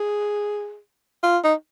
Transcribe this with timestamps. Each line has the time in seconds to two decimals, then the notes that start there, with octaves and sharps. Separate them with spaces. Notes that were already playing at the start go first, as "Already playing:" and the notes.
Already playing: G#4
1.23 F4
1.44 D#4